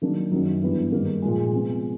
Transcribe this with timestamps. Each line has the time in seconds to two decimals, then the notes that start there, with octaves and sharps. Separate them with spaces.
0.02 D#3 F#3 A#3 D4
0.32 F#2 D#3 F#3
0.62 G2 E3 G3 B3 E4
0.92 G#2 D#3 G3 A#3
1.22 A#2 F3 G#3
1.53 C3 F3 G#3 B3